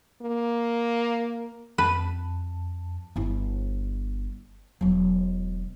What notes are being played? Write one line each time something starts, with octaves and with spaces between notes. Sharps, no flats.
A#3
F2 B4 A5
G1 E4
E1 F#3